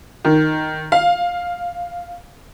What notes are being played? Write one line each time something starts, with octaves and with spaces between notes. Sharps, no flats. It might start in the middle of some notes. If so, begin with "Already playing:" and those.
D#3
F5